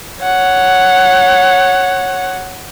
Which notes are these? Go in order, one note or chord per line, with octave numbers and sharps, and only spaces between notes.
C#5 F#5